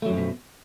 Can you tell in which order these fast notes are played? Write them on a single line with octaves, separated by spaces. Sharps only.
A3 F#3 F#2 F3 B2